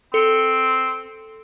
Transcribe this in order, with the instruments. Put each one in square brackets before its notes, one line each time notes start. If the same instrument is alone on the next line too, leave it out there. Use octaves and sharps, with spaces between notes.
[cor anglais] C4 [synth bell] A4 C#7